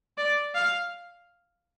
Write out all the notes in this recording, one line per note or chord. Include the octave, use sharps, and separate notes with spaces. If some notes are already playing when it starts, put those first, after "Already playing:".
D5
F5